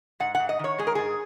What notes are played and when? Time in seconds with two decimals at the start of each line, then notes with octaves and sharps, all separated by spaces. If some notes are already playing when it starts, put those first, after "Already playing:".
0.20 G#2 F#5
0.35 G#2 F#5
0.49 D#5
0.59 D#3 C#5
0.78 G#3 G#4
0.87 A#4
0.95 G#2 G#4